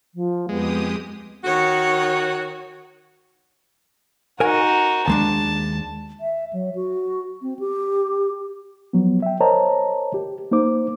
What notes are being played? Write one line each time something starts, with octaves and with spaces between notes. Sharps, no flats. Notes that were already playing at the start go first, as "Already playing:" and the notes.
F3
F2 G#3 B3 G4 D#6
D#3 F#4 C#5
D#4 F#4 A#4 G#5
D#2 G#3 D4 A5
E5
F#3
F#4
C4
G4
F3 F#3 B3
E5 G5
A#4 C5 C#5 D#5 A5 A#5
G4
A#3 D#4 C5 D6